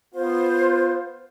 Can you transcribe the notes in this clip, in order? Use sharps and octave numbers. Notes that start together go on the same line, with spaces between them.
B3 F4 C5